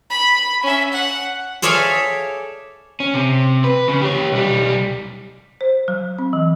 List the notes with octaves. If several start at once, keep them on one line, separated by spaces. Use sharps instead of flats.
B5
C#4 E5
F#5
G#4 A4 C#5 D5 E5 F5
C#4
C3
B4
C#3
G4 C#5
B1 G3
C5
F#3
C4
E3